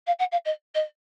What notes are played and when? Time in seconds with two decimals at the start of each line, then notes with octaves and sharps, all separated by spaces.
0.07 F5
0.19 F#5
0.32 F5
0.45 D#5
0.74 D#5